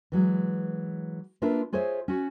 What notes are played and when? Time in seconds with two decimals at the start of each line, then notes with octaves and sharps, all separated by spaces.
0.12 E3 F#3 G#3
1.42 A#3 D4 F4 A#4 B4 E5
1.73 F4 G#4 C5 C#5 D#5 E5
2.08 C#4 F#4